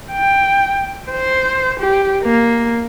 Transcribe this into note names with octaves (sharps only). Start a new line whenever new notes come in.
G5
C5
G4
A#3